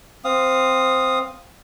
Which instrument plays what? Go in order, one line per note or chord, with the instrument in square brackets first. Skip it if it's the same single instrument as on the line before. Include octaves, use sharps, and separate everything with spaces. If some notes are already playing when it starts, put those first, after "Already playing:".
[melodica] C4 F5 D#6